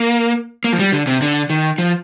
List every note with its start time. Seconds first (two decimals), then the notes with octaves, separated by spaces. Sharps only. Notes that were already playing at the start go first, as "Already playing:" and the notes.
Already playing: A#3
0.64 A#3
0.73 F3
0.79 G3
0.92 D3
1.07 C3
1.22 D3
1.50 D#3
1.78 F3